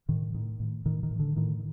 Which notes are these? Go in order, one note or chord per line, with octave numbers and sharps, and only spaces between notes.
A2 D#3
A2 D#3
A2
A2 D#3
D#3
A2
D3
A2 D#3